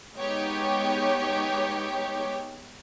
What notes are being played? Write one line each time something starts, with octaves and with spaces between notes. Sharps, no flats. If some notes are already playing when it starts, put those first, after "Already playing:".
G#3 B3 D#4 G4 C#5